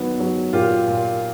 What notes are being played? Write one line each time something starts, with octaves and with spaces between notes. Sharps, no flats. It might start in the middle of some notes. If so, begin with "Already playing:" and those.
Already playing: D#3 F#3 B3
F#3
A#2 F4 G4
A#2